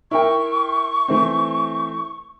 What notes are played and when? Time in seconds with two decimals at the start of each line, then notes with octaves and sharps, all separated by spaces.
0.11 E4 A#4 G5 C#6
1.08 E3 A3 C4